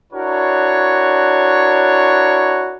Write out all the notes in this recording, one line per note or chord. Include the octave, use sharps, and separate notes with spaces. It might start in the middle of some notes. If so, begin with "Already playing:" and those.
D4 E4 F#4 A#4 C#5